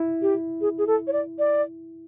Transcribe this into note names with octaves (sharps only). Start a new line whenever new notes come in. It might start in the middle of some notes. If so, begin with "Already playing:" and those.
Already playing: E4
G4
G#4
G#4
A4
C#5
D5
D5